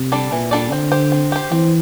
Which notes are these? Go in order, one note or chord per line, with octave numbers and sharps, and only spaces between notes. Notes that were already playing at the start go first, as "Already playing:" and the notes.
Already playing: C3
G3 D4 A4 D5
A#2 E3
G3 D4 A4 D5
D3 C4
G4 C5
C4
G4 C5
E3 C4